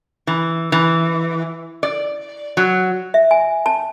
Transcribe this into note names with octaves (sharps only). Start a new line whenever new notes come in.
E3
E3
D5
F#3
E5
G#5
A5